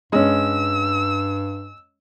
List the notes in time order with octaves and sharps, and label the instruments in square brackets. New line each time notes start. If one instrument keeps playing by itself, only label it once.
[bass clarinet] G2 [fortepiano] G#3 C#4 [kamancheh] E6